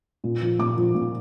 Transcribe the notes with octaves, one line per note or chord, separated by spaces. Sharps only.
A#2
F3
A#2 D6
F3
A#2